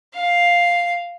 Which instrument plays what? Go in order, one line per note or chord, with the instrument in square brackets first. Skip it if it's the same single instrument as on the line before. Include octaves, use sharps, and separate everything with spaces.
[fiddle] F5